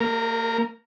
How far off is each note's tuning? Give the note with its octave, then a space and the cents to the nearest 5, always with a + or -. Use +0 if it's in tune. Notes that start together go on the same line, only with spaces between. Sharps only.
A#3 -35 A#4 +0